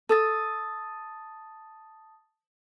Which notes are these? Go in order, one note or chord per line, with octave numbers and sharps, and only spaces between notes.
A4 A5 D#6 A6